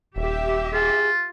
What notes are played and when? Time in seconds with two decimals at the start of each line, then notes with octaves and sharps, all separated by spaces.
0.16 D#1 G4 E5
0.73 F4 G#4